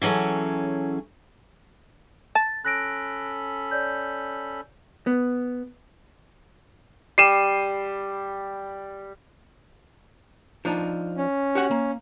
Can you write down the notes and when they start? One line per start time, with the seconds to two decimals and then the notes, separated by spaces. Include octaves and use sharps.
0.02 E3 F#3 C#4 G#4 A4
2.35 A5 A6
2.65 C#4 A4 B5 F#6 A#6 D7
3.71 C#5 D5 G6
5.07 B3
7.18 G3 C7 D#7 E7
10.65 F3 D4 D#4
11.17 C#4
11.55 F#4 G4 F#5
11.71 A#3